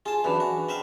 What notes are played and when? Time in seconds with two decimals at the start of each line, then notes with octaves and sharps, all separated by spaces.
0.06 F4 G#4 A5
0.24 F#2 E3 B3 D4
0.40 F#4
0.69 C4 E5 F5